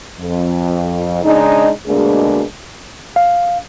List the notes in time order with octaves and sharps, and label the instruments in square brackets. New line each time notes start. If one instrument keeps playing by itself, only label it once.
[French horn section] F2
C#3 G#3 D4 D#4
D2 B2 G#3 A#3 D4 G#4
[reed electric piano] F5